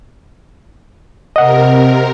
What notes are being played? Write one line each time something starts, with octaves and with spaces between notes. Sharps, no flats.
C3 A#4 D#5 F#5